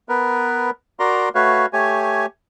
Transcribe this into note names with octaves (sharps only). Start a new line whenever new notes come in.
B3 A#4 B4
F#4 A#4 D5 A#5 C6
A3 F#4 B4 C#5 F5
A3 G4 C#5 G#5